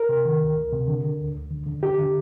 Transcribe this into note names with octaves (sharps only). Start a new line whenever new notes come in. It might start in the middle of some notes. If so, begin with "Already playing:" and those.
Already playing: A#4
C3
D#3
D2
D2
C3
D3
D3
D2
D2
D3
D3
D3 G4
D3